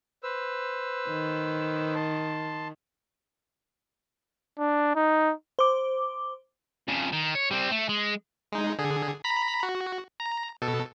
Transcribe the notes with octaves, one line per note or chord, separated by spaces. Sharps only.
B4 C5 E6
D#3
A5 C6
D4
D#4
C5 D6
F2 C#3
D#3
C#5
G3 C4
A3
G#3
G#3 D#4
D3 G#4
A#5 B5 B6
F#4
A#5
B2 A4